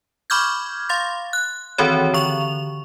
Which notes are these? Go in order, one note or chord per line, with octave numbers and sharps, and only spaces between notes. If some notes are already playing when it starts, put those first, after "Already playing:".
B5 C#6 D6 F6 G6 G#6
F5 C6 A6
F#6
D#3 E3 C4 F#4 C#5
D3 C#6 F7